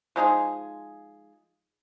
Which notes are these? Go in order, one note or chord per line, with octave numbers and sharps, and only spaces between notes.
F3 G#3 D#4 G#4